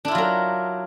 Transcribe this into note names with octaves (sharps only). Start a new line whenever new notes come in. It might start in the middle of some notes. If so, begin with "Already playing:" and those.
F#3 D4 E4 F4 A#4